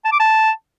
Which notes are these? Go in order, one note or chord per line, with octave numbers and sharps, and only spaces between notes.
A5
D6
A5